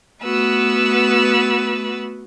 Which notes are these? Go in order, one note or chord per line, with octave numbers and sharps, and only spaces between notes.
A3 B3 F#4 B4 E6